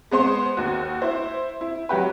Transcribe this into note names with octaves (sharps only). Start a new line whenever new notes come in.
G#3 B3 C5 C6
D#2 F#4
E4 C5
E4
F#3 F#4 G4 B4